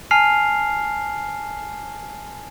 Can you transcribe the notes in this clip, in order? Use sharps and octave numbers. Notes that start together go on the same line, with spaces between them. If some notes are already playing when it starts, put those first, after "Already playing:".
G#5 A5 F6 C7 F7